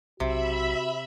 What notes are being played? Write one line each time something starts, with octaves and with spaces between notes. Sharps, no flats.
B1 C3 F#4 E5 B5